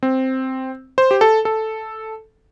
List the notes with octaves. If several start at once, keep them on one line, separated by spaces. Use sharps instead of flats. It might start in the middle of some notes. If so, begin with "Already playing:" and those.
C4
C5
G4
A4
A4